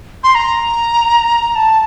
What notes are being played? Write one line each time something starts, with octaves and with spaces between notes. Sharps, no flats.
C6
A#5
A5